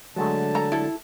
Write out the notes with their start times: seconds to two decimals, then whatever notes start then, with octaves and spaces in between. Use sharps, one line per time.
0.16 D3 F#3 G#3 A3 A5
0.55 A4 A#5
0.72 E4 A4